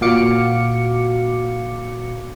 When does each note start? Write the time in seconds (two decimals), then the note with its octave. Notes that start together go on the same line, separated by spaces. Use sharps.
0.01 A#2 F#4 F5 D6 C#7